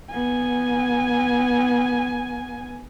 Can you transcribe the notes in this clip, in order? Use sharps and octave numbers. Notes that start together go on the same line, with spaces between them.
B3 G#5